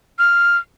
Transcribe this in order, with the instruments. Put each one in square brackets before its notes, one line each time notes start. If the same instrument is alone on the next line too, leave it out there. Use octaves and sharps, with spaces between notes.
[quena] F6